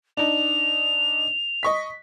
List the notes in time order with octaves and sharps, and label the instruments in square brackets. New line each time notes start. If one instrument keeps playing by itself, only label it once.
[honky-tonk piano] D4 D#4 [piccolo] F7
[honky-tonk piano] D#5 C#6 B6